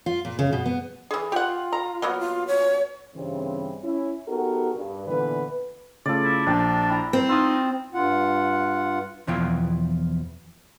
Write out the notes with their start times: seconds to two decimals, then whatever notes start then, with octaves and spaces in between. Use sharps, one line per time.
0.06 F4
0.25 A#2
0.39 C#3
0.53 B2
0.66 B3
1.11 E3 G#4
1.32 F4 G4 F#5
1.73 A#5
2.02 F#3 A#3 B3
2.19 F4
2.48 C#5
3.15 G2 C#3 E3 G3 C4
3.83 C#4 E4
4.28 B3 D#4 F#4 G4 A4 A#4
4.76 G2
5.07 A#2 D3 E3 B3 B4
6.05 C#3 A3 F4 A4 D5
6.23 E4
6.46 A#1 D4 D5 G5
6.89 E4 G5 A#5
7.13 C4
7.29 D#4 F4 D#6 E6
7.94 G2 F4 F#5
9.27 E2 B2 F3 E4 F4 G5